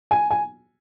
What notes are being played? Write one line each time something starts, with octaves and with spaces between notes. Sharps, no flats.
G#5
G#5